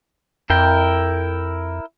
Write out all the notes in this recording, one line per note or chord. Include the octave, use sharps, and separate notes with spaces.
F2 E4 A#4 G5